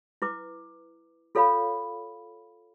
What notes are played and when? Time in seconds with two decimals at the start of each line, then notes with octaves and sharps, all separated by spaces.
0.22 E4 B4 D6
1.35 F4 A4 C#5 F5 B5